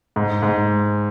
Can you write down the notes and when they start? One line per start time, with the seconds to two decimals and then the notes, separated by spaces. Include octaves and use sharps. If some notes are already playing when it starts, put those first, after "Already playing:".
0.16 G#2
0.42 G#2